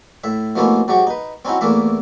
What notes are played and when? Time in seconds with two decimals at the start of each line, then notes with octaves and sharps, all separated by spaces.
0.24 A2 E5
0.56 B2 F3 A3 A#3 C#4 E4
0.88 G#2 F#3 F#4 G4 C#6
1.07 D#4 B4
1.45 C4 C#4 D#4 E4 F#4
1.61 E2 E3 A3 A#3 E5